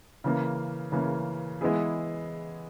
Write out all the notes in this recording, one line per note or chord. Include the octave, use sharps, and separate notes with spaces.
C#3 E3 A#3
C#3 E3 A#3
E3 G#3 B3 E4 G#4